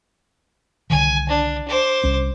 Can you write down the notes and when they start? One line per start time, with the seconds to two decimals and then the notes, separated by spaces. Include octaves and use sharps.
0.90 C2 D3 D#3 G#5
1.28 D4
1.68 C5 D6
2.04 C2 C#4